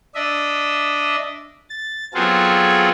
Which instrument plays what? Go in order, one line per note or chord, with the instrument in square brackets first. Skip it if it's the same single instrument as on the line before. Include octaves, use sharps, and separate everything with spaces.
[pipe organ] D4 D#5 E5
A6
F#3 B3 C4 F4 G#4 A4